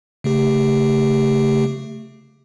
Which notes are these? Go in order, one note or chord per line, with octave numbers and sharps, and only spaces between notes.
C#3 A3 G4